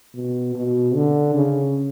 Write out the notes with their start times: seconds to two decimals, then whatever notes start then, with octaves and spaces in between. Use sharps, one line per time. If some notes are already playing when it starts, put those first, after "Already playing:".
0.15 B2
0.56 B2
0.95 D3
1.35 C#3